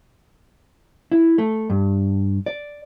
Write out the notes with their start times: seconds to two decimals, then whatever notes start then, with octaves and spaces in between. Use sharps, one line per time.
1.12 E4
1.38 A3
1.70 G2
2.46 D5